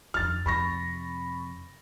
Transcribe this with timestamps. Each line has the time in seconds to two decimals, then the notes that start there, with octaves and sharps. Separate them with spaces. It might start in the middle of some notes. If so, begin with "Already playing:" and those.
0.14 F2 D3 F6 A6
0.46 F2 C3 B5 C#6 A#6